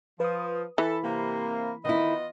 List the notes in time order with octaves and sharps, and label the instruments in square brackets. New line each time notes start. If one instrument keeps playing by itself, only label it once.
[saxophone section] F3 [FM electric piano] B4 D#6
[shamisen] E3 [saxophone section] A4 [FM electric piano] B5
[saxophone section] C3 A#3
[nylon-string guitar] D#3 E4 [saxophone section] B3 F4 D#5